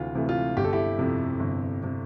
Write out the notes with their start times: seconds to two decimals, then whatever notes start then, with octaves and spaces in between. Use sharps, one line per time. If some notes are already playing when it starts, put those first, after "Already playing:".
Already playing: D2 C3 E3 F4
0.15 C3 E3 A3
0.29 F4
0.57 G1 G4
0.64 A4
0.73 E4 G4
0.99 F2 C3
1.40 G1
1.83 C3